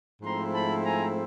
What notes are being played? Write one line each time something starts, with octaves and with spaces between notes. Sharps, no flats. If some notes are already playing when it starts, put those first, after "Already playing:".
G#2 F3 A3 C4 E4 A#5 C6
A5 B5
G#5 A#5